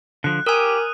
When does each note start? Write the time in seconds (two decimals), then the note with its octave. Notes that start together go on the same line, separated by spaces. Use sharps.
0.24 D3 F3 F#6
0.47 G4 A#4 G#5 D#6 E6 D#7